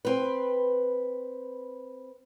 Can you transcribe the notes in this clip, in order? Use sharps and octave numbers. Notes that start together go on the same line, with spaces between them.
C4 B4